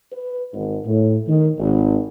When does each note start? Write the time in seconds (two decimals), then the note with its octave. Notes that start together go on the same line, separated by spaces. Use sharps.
0.12 B4
0.53 G#1
0.85 A2
1.28 D#3
1.59 G#1